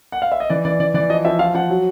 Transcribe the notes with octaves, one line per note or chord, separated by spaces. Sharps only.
F#5
F5
E5
D#5
E3 D5
E3 D5
E3 D5
E3 D5
F3 D#5
F3 E5
F3 F5
F3 F#5
F#3